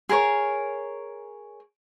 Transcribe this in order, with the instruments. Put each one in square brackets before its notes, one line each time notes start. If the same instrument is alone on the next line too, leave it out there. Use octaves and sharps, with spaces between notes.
[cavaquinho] G#4 A#4 C5 C#5